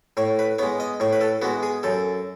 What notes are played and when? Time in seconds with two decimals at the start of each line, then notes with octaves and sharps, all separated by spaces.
0.17 A2 C#5
0.39 B4
0.59 G#3 B3 C#5
0.80 D#5
1.00 A2 C#5
1.13 B4
1.21 A4
1.42 G#3 B3 F#4
1.63 G#4
1.83 F#2 A4